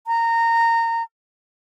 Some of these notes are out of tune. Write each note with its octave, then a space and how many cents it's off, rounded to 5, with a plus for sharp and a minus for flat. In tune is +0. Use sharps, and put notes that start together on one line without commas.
A#5 -20